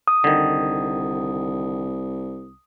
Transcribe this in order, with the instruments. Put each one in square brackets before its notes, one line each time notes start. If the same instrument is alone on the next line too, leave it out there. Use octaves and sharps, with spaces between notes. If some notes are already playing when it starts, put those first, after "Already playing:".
[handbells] D#6
[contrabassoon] C2 [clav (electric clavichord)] D3 D#3